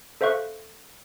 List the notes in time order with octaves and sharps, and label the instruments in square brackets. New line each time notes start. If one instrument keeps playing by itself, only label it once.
[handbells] A4 C5 E5 F5 C#6 F#6